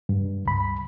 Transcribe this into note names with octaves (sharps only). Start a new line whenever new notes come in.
G2
C#2 B5